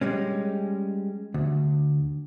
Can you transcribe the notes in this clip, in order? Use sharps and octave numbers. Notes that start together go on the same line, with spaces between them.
G3 G#3 C#4
D2